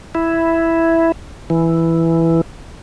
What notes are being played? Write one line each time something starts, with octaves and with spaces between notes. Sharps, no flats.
E4
E3